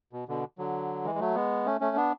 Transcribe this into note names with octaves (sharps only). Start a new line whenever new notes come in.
B2
B2 D3
D3 F#3
E3 G#3
G#3
F#3 A3
G#3 B3
A3 C#4
A3 C#4
B3 D4